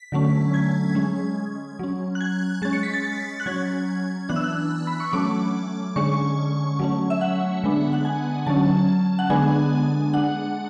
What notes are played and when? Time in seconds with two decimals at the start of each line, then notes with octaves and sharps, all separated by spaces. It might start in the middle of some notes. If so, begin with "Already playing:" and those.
Already playing: B6
0.12 D3 F#3 A3 C#4
0.54 G#6
0.95 G#3 C#4
1.79 F#3 C#4
2.15 F#6
2.21 G#6
2.62 G#3 C#4 A6
2.73 C#7
2.83 B6
2.94 A6
3.04 A6
3.40 F#6
3.46 F#3 C#4 G#6
4.29 E3 B3 D4 F#6
4.36 E6
4.44 F#6
4.87 B5
5.00 C#6
5.13 F#3 A3 C#4 D6
5.96 D3 G#3 C#4 C#6
6.79 F#3 A3 C#4
7.10 E5
7.21 F#5
7.64 D3 G#3 B3 D4
7.93 F#5
8.05 G#5
8.46 D3 F#3 C#4 A5
9.19 F#5
9.30 D3 G#3 B3 D4 G#5
10.13 G#3 D4 F#5